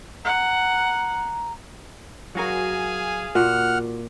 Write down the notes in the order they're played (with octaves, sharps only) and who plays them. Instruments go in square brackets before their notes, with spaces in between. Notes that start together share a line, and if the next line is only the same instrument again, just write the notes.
[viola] F#5 [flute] A#5
[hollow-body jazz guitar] F#3 F#4 A#4 [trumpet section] G#4 F5 G#5
[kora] A#2 [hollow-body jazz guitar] F#4 [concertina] F#5 F6